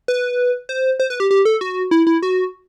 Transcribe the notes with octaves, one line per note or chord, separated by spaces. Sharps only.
B4
C5
C5
B4
G4
G4
A4
F#4
E4
E4
F#4